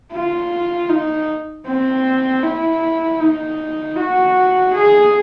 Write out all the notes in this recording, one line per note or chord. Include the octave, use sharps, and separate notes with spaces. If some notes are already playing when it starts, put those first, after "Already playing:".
F4
D#4
C4
E4
D#4
F#4
G#4